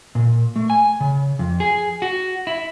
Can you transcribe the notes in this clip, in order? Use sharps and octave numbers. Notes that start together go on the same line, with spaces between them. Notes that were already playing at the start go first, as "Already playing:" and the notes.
A#2
A3
G#5
C#3
F2
G#4
F#4
E4